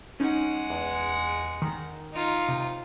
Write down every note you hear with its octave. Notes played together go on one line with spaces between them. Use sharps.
G#3 C#4 D#4 F#5
E2
D#3
D#4 F4
C3